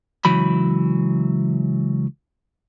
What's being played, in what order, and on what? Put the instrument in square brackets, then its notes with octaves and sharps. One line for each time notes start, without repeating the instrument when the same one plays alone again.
[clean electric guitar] C#2 E3 F#3 B5